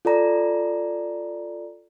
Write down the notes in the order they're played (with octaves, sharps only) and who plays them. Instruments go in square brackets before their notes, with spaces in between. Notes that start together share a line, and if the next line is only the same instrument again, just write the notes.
[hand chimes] F4 A4 D5 A#5